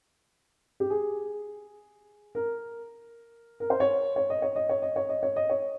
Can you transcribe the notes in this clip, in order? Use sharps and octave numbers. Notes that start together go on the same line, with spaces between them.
G4
G#4
A#4
A#4
C5
C#5
C#5
D#5
C#5
D#5
C#5
D#5
C#5
D#5
C#5
D#5
C#5